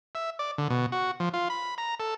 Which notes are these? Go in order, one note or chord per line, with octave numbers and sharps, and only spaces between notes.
E5
D5
D3
B2
F#4
F3
F4
B5
A#5
A4